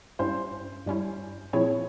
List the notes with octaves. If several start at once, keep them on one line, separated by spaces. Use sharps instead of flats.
G2 G3 C#4 E4 C5
G2 G3 C#4 E4
A#2 F3 C4 E4 G#4 C#5